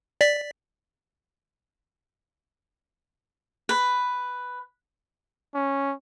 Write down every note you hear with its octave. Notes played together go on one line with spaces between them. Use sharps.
D5 B6
B4
C#4